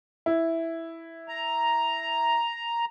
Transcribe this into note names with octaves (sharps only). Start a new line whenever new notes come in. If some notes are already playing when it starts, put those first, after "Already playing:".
E4
A#5